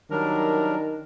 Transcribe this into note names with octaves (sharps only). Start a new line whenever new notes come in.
D#3 F#3 G3 D4 A#4